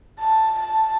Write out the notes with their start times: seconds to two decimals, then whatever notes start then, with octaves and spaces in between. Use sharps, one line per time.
0.20 A5
0.59 A5